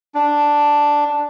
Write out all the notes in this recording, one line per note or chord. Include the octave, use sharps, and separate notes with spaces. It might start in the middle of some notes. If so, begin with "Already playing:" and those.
D4